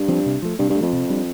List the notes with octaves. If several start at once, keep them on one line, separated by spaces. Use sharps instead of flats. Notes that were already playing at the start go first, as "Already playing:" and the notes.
Already playing: G2
F3 C4
C3
F3 A3
G2 C3
G2
A3
F2 F3
C3
G3 D4